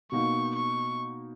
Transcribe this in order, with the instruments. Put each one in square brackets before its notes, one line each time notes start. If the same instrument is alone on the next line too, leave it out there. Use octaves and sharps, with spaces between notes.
[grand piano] B2 A#3 D#4 F#4 [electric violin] C#6
[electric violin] C#6